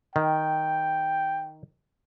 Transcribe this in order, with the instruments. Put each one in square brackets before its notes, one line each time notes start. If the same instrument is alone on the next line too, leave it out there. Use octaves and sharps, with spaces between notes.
[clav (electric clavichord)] D#3 [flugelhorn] G5